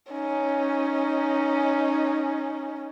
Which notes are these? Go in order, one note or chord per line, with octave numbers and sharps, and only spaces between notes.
C#4 D#4